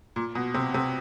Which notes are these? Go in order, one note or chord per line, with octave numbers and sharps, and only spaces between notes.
A#2
B2
C3
C3